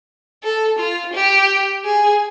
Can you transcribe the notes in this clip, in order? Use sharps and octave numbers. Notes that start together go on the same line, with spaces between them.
A4
F4
G4
G#4